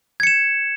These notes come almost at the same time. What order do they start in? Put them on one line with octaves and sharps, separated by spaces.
G#6 C#7 E7